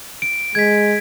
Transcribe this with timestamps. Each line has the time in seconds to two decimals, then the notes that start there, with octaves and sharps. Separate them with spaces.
0.22 D7
0.55 G#3 G#6 B6